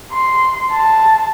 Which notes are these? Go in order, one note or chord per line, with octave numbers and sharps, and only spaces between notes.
C6
A5